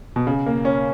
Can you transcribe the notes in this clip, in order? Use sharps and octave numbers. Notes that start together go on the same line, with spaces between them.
B2
C#3
A#3
C#4